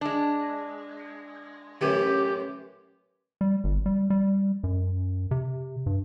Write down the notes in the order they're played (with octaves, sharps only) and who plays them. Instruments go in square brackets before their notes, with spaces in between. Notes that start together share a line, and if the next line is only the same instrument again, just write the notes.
[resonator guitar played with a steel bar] G#3 D4
[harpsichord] A1 F#2 E3 [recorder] G4
[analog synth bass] G3
G1
G3
G3
F#2
C3
G2